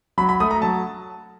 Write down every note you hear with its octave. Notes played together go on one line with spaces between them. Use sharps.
F#3 B5
B5
A3 D#6
A#5
F#3 A5